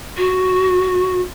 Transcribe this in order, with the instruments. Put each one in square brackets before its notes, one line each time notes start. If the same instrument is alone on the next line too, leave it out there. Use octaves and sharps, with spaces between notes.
[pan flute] F#4